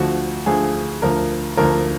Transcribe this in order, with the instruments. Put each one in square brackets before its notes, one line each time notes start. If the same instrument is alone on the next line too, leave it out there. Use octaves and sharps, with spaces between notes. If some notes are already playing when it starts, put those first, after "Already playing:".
Already playing: [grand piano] D2 D3 F3 F#4
D2 D3 F3 G#4
D2 D3 F3 A#4
D2 D3 F3 A#4